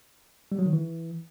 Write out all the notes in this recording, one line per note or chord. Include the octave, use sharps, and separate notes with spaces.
G3
F#3
D#3
E3